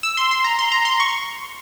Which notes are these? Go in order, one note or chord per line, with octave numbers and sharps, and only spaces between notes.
E6
C6
C6
A#5
C6
A#5
C6
C#6